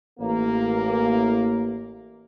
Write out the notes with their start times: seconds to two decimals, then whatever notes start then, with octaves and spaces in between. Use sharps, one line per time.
0.19 A1 A#3